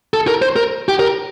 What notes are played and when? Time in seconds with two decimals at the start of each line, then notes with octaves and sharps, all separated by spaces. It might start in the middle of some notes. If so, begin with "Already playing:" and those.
0.14 A4
0.28 A#4
0.42 C5
0.56 A#4
0.89 G4
0.99 A#4